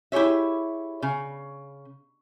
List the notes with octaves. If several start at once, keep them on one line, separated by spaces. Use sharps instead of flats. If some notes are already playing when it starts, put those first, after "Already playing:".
E4 G4 G#4 C#5 E5
C#3